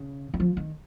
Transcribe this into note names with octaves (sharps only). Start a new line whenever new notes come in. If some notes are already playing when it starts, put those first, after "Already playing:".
Already playing: C#3
D#3
F3
D#3